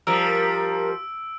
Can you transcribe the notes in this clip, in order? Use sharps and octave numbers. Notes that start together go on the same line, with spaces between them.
F3 G3 A#4 E6 D7